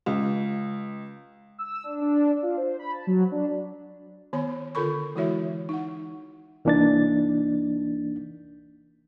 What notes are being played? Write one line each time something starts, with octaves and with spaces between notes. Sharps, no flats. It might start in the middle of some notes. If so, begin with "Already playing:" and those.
C#2
E6
D4
D4
F4
C5
B5
A5
F#3
D4
D#3 B3 C#5 B5
D3 F4 A4 A#4 B5 C#6
E3 G#3 E4 F#4 C#5 E5
D#4 F#5
C2 E3 A#3 D4 D#4 A6